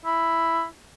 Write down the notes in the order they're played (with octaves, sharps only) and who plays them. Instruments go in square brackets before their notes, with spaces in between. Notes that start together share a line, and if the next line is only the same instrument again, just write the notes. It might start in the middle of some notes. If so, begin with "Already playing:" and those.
[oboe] E4